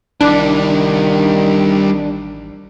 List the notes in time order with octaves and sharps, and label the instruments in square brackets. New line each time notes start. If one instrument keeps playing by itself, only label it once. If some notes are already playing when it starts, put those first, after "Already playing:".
[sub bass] A1 [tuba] D#3 [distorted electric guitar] G3 E4 [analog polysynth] D4